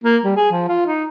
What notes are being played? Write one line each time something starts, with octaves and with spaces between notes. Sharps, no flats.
A#3
G3
G#4
F3
F4
D#4